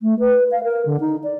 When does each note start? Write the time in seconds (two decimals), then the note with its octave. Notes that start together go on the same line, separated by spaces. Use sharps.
0.02 A3
0.19 B4
0.51 F5
0.64 A#4
0.86 D3
1.00 D#4
1.24 D5